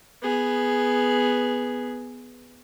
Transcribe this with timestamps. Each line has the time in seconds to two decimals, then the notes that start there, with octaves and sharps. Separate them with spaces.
0.22 B3 G#4